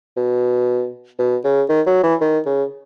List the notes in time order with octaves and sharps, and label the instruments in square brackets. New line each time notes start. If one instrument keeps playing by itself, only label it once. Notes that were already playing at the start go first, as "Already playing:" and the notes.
[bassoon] B2
B2
C#3
D#3
F#3
E3
D#3
C#3